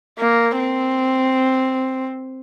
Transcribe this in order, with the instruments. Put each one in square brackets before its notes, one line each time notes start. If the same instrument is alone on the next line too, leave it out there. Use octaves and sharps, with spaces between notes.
[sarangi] A#3
C4